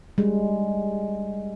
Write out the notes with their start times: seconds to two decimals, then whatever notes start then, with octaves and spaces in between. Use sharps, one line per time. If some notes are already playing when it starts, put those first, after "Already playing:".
0.18 G3 G#3